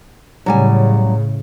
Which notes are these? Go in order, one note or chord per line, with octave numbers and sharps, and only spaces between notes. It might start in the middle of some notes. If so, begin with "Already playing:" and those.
A2 C#3 F#3 G3 G#5